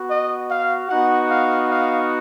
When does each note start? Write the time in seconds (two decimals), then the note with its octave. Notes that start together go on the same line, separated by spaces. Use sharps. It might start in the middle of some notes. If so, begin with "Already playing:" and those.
Already playing: B3 F#4
0.09 D#5
0.49 F5
0.89 B3 D#4 F#4 F#5
1.30 F5
1.70 F5